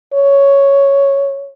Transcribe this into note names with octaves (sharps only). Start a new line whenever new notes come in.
C#5